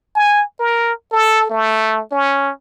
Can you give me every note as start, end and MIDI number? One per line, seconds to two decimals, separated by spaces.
0.15 0.43 80
0.60 0.93 70
1.12 1.47 69
1.50 2.02 57
2.11 2.51 61